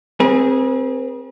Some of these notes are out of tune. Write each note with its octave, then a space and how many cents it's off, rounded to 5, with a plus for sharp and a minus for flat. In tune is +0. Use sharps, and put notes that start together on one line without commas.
C4 +0 G#4 -10 B4 -45